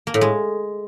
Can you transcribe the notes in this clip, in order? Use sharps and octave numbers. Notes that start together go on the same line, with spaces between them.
A#3
A2
G#3